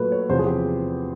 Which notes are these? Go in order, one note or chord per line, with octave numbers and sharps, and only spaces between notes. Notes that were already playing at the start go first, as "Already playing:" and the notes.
Already playing: A#2 F#3 A3 B4
C#5
E2 C3 F3 C5
G#4
G4